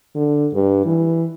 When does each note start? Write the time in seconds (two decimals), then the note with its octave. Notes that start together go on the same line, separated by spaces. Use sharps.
0.16 D3
0.54 G2
0.85 E3